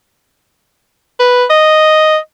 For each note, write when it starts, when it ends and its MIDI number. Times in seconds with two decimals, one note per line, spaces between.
1.19 1.44 71
1.50 2.17 75